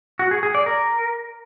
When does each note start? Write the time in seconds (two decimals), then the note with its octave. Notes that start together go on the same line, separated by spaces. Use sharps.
0.19 F#4
0.31 G#4
0.43 G#4
0.55 D5
0.66 A#4